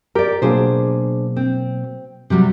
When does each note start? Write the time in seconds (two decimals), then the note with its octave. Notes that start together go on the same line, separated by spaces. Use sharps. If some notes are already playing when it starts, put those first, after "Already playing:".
0.15 G4 A#4 D5
0.42 B2 F#3 A#3 D4 G#4 C5
1.36 C4
2.30 C3 F#3 G3